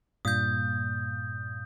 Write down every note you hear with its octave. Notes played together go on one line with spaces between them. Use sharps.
G2 A#2 D#6 G6